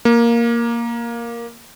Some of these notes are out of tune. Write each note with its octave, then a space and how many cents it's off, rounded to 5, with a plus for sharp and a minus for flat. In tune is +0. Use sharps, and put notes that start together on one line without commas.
A#3 +5